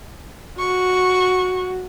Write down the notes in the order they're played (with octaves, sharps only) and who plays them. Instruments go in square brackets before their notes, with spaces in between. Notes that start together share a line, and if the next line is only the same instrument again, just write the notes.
[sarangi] F#4 [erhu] C#6